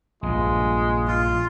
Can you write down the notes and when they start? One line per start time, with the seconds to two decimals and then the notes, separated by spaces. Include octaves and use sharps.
0.23 A#1 G2 G#3 F4
1.07 F4 C6